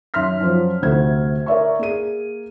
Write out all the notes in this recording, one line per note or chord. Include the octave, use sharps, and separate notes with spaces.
F#2 D#3 E5 C6 F6 B6
F#2 F3
D2 C3 A3 G#6
A#4 D5 E5 C#6
A#3 G#4 D#7